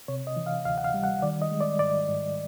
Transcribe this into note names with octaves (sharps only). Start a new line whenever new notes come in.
C3 C#5
D#5
E3
F5
D2 F5
F#5
F5
G3
F#5
D#3 D5
D#5
G#3
D5
G#2 D5
G#2